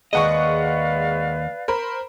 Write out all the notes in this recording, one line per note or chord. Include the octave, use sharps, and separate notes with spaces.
D#2 G#3 B4 D5 D#5 F5 F#5 C#6
A#4 C5 B5